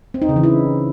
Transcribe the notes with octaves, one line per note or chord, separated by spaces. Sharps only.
C4
D#4
C#3
E3
E4